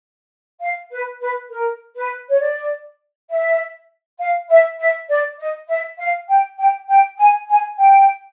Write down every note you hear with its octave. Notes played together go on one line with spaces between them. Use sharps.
F5
B4
B4
A#4
B4
C#5
D5
E5
F5
E5
E5
D5
D#5
E5
F5
G5
G5
G5
G#5
G#5
G5